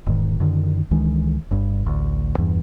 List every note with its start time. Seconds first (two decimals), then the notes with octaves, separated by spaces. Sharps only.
0.06 E1 G#2 D#3
0.40 F#2 D3 D#3
0.91 C#2 D#3 E3 G#3
1.51 G1 G2
1.86 A1 D2
2.38 E2 G2 E3